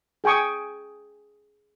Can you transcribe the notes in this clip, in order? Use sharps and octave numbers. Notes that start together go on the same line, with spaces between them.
G#4 G5 G#5 C#6 D#6